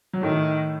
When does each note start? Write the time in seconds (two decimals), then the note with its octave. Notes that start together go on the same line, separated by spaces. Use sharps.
0.13 F#3
0.22 A2 D#3 A3